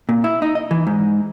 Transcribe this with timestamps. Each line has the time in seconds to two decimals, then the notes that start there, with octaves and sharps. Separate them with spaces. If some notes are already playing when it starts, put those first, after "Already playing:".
0.09 A#2
0.24 E4
0.42 D#4
0.55 D#5
0.71 E3
0.87 G#2